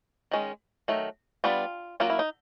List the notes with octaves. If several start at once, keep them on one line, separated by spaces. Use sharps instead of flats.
D#3 G#3 C#4
D#3 F#3 A3
G3 B3 D4 F4
F#3 A#3 C#4 F4
E4
D#4